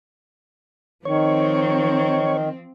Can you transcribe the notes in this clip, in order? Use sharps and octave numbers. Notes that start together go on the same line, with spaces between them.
D#3 F3 C4 C#5